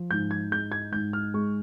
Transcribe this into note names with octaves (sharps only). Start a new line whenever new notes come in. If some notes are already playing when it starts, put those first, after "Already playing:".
Already playing: F3
G#2 G6
G#6
G#3 G6
G#6
G#2 G6
F6
G#3 C#6